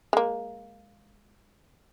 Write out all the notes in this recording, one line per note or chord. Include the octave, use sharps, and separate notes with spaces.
G#3 A#3